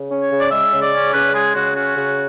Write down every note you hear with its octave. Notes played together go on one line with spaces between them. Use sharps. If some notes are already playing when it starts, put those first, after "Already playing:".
Already playing: C#3
C#4
C#5
C#3
D5
G#3 E5
C#3
D5
C#4
C#3 B4
G#3 G#4
C#3 F#4
C#4 F#4
C#3